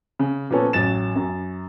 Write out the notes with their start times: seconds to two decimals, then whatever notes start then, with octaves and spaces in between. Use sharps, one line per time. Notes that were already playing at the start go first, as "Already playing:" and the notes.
0.19 C#3
0.50 A#2 F3 B3 C#4 A4
0.73 A1 F#3 A6 E7
1.16 F#2